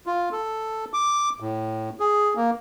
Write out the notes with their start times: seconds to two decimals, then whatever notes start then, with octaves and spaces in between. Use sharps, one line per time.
0.06 F4
0.32 A4
0.93 D6
1.40 A2
2.00 G#4
2.36 A#3